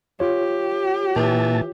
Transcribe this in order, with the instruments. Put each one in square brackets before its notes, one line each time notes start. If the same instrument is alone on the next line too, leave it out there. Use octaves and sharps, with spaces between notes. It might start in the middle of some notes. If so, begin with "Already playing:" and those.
[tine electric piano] F4 C#5 [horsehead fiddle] G4
[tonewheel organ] A#2 A5 [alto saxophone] E3